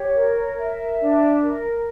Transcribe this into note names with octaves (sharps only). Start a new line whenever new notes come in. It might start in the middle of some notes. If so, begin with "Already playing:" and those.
Already playing: G4 C#5
A#4
E5
D4
A#4